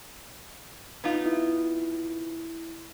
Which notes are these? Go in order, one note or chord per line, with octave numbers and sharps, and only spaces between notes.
B3 D#4 F4
E4